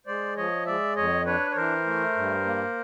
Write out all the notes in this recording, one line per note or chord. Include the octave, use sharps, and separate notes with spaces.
G#3 C5 D5
F3 C#5 D#5
G#3 D5 E5
F2 C#5 D#5
D4 B4 C#5
C#5
E3 A#4 C5
A3
G2
A#3